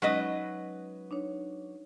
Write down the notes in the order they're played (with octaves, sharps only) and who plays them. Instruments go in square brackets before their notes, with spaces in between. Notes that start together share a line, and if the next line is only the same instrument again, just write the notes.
[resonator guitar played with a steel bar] F#3 B4 D#5 [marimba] G#3 C#4 D#4
[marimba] D4 D#4 C#5